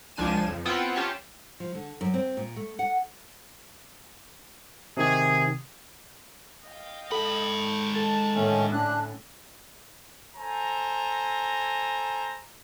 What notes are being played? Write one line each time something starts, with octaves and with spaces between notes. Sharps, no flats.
C#2 F3 D4 G#5 D#7 E7
F2
B3 C4 E4 F4 F#5 G5
C#4 F4 G4 E5 A5
F3
D3
F#2
C4
A#2
A3
F#5
C3 D#3 G#4 G#6
D#5 F5 G5
G#2 A4 B5
A4 A5 A6
A2 D3 D#3 A3 C#4
C#4 D4 F#6
A4 C5 G#5 A#5